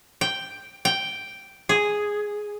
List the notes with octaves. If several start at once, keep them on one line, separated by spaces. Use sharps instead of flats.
G5
G5
G#4